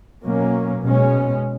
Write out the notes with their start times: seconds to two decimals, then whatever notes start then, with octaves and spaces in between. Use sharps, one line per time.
0.24 B2 F#3 A#3 C#4
0.84 B2 G#3 C#4